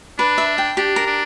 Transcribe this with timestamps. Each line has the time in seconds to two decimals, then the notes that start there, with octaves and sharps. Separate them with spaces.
0.18 D4 B4
0.38 E5
0.58 G5
0.77 D4 G4
0.96 A#4
1.07 D4